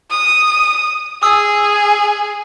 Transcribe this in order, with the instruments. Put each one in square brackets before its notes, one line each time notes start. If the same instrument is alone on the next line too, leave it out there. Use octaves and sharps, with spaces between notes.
[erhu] D#6
[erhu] G#4 [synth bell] D#6 E6